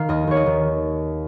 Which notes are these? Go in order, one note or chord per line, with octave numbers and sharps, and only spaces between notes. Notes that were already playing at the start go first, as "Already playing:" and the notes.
Already playing: D#3 F5
D#2 D#5
D#2 C#5
D#5
D#3